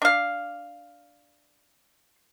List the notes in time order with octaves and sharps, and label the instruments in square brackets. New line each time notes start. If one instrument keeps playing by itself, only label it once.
[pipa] D4 F5